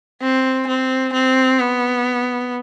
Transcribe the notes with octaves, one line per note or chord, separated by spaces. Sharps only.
C4
C4
C4
B3